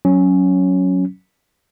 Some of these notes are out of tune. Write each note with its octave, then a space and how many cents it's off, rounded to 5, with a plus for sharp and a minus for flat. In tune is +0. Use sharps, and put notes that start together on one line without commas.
F#3 +0 C#4 +0